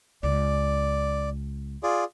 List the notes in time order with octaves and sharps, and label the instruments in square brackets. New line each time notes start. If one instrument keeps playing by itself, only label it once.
[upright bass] C#2 [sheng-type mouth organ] D5
[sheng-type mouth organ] F4 G#4 D5